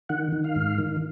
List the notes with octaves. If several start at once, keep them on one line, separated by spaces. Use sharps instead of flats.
D#3 F#5
D#3
F5
G#2
D#3